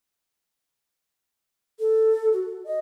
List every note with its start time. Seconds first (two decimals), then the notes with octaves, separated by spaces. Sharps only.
1.79 A4
2.33 F#4
2.64 D#5